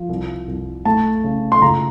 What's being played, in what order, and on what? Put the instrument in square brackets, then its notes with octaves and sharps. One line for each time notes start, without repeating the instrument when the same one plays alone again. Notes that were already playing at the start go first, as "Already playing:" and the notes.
Already playing: [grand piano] F3
C2
C2
A3 A5
C#3
C6
C#2 A#5